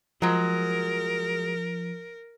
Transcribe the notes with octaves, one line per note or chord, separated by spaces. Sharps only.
F3 F#3 G#3 A#4